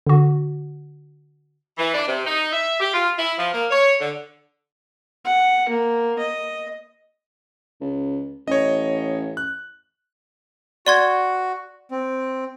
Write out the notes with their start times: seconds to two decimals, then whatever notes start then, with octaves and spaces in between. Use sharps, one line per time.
0.06 D3 F#4
1.78 E3
1.94 D4
2.07 C3
2.25 D#4
2.52 E5
2.80 G4
2.93 F4
3.18 E4
3.37 F3
3.52 A#3
3.70 C#5
4.00 D3
5.25 F#5
5.69 A#3
6.19 D#5
7.81 C#2
8.48 A1 C#5 D#5
9.37 F#6
10.86 F#4 D5 C6 G#6
11.91 C4